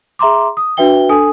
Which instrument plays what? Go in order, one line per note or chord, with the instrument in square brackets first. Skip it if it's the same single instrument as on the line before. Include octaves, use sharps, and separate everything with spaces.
[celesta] G#4 E5 A#5 C6 D6
D#6
D4 F#4 B4 E5 G5 G7
D4 A4 G#5 D#6